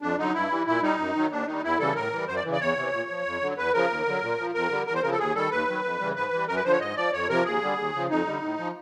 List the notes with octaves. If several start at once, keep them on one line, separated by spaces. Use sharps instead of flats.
F2 D4
D3 F#3 D#4
G2 E4
E3 G3
A#2 E4
G3 D#4
F#2
D#3 F#3
D#2 D4
D#3 G3 D#4
E2 E4
C#3 E3 G3 A4
A2 A#4
E3 G3
F#2 C5
D5
C#3 E3
D5
E2 C#5
C3 E3
A#2
F3
F2
D3 F#3
E2 B4
C#3 F3 A#4
D#2
D3 F#3
A#2
F3
F2 A#4
D3 G3
E2 A#4
C5
C#3 F3 A#4
A4
D#2 G#4
D#3 G3 A4
D#2 B4
D#3 F#3
F2
C#3 E3 G3
G#2 B4
E3 G3
F#2 A#4
B4
D3 F3 C5
C#5
G#2 D#5
F3 D5
F2 C#5
C3 F3 A#4
D#2 G#4
D3 G3
D#2
C#3 F3
F2 D#4
D3 G3
A2
F3